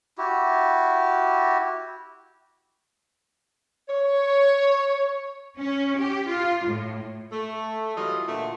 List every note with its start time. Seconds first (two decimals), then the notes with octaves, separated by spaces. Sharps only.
0.18 E4 F#4 G4
3.88 C#5
5.58 C#4
5.98 G4
6.28 F4
6.65 A2
7.33 A3
7.96 E3 F#3 G3 F4 D#5
8.27 A#2 D3 E3 A3